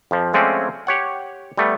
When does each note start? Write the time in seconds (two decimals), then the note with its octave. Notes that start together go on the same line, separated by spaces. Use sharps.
0.11 F2 F3
0.33 F3 G#3 A3 C4 C#4 D5
0.87 G4 C#5 F#5
1.57 G3 A3 B3